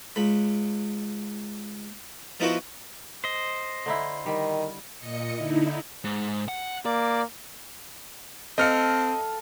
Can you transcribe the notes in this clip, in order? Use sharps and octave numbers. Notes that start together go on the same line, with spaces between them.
C#2 B5
F3 B3 D#4 E4 F#4 B4
C5 D#5
D3 D#4 E4
D#3 G3
A#2 D#5 C#7
D3 D#4 E4
G#2
F#5
A#3 D5
C4 A4 D#5 F5 F6 C#7